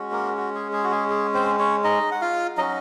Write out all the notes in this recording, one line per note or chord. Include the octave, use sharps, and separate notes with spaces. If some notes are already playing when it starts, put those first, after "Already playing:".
Already playing: G#3 C#4 F#4
A#3 A#4
F#4
G#4
G#4
F#4
G#4
G#4
C4 C5
C#4 C#5
D#4 D#5
F#5
F4 F5
F#3 C#4 D#4 F#4 D#5